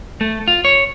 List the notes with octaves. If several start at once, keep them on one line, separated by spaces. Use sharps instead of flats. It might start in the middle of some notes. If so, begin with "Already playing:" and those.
A3
F4
C#5